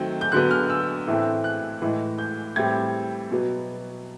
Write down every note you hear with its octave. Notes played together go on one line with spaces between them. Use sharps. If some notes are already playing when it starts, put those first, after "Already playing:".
Already playing: D#3 F#3 A3 C4
G6
D3 F#3 B3 F#6
F6
E6
A2 E3 A3 C4
F#6
A2 E3 G#3
G6
A2 E3 G3 C4 G#6
B2 F#3 B3